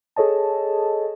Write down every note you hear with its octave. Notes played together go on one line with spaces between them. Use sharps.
G#4 A4 C#5 D#5 A5